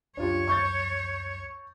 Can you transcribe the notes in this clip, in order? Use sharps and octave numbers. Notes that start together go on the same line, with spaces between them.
C#2 F#2 D4 F4 G4 C#5
C#6 G6 A6